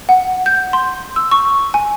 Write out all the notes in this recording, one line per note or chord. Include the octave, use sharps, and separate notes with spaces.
F#5
G6
C6
E6
C#6
G#5